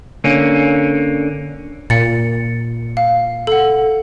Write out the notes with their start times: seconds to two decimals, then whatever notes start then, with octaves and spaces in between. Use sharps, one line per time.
0.24 D3 A#3 C#4
1.90 A#2 A6 C#7
2.97 F5
3.47 A4 F#5